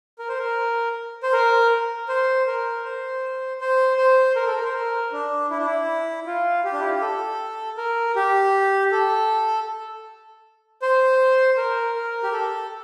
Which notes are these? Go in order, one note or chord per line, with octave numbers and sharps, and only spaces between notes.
A#4
C5
A#4
C5
A#4
C5
A#4
C5
C5
C5
A#4
A4
A#4
C5
A#4
D4
E4
D4
E4
F4
G4
D4
E4
F4
G4
A4
A#4
G4
A4
C5
A#4
A#4
G4
A4